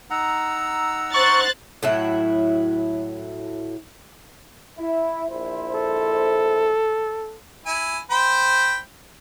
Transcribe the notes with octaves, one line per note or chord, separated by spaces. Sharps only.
D#4 F#5 A#5 E6
C5 C#6 F#6 A6
A2 F#3 E4
E4
A#1 E4 C5
A4
E4 G#5
C5 G5 B5